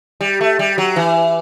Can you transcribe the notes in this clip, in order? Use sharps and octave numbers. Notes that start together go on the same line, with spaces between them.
G3
A3
G3
F#3
E3